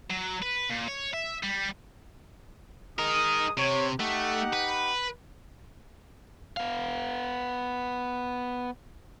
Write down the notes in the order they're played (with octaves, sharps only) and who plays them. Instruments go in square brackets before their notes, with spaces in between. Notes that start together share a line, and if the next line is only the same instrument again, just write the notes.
[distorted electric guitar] F#3
B4
A#2
C#5
E5
G3
[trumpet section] G#3 D#6 [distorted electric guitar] D#4 A#4
[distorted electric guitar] C3 [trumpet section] C#5
[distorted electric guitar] A3 [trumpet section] D#4 G4 F#5
[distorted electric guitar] B4
[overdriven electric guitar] B3 F5